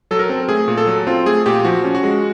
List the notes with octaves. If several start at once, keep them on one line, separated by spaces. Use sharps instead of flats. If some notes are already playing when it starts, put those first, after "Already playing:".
F#3 A4
A#4
C4
A3 G#4
A#2
A4
F#3
C4 F4
A3 G#4
A#2 G4
F3 F#4
C#4
F#4
G#3